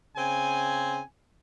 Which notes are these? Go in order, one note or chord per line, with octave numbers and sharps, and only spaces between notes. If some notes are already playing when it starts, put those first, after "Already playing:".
C#3 C4 G#5